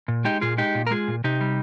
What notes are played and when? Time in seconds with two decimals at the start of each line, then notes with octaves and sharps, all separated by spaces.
0.08 A#2
0.25 G#3 D#4 G4
0.41 A#2 F4 G#4
0.58 G#3 D#4 G4
0.75 A#2
0.87 A#4
0.91 G#3 F4 G#4
1.08 A#2
1.24 C3 D#4 G4
1.41 G3